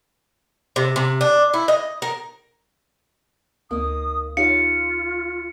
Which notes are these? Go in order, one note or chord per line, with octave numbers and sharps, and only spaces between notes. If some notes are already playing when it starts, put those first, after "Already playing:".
C3
C3
D4
E4
D#5
A#4
D2 A#3 D#4 D#6
D#4 F4 G4 C#5 F5 C#7